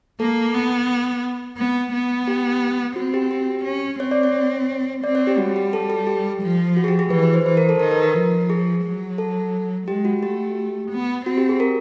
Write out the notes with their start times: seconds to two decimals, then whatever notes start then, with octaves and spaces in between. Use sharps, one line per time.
0.20 A#3 A4
0.54 B3
1.57 B3
1.93 B3
2.28 G4
2.96 C4 F#4
3.14 G4
3.31 G4
3.65 C#4
4.00 C4 C#5
4.11 D5
4.23 C#5
5.04 C4 D5
5.15 C#5
5.27 G4
5.38 G3 F#4
5.56 G4
5.73 A4
5.90 A4
6.07 G4
6.42 F3
6.77 F#4
6.84 G#4
6.88 G4
6.99 G#4
7.10 E3 B4
7.23 B4
7.34 C5
7.46 E3 C5
7.57 A#4
7.69 A4
7.79 D#3 A#4
7.91 B4
8.03 A#4
8.14 F3
8.50 G#4
8.84 F#3
9.18 A4
9.87 G#3 G4
10.05 F#4
10.22 A3 G4
10.91 B3
11.26 C4 F#4
11.37 G4
11.49 G#4
11.60 A#4